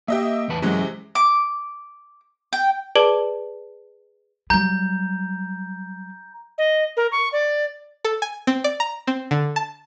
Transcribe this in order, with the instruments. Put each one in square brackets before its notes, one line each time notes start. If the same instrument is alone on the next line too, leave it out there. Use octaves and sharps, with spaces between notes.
[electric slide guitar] A#3 [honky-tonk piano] G4 D#5 E5
[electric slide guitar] E2 B4 A5
[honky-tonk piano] C3 E3 G#3 [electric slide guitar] F#3 C#4
[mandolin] D6
G5
[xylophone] G#4 B4 D5 A5 D6 G7
[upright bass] F#3 G3 [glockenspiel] A#5 G6
[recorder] D#5
A#4
C#6
D5
[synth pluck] A4
G#5
C4
D5
A#5
C4
D3
A5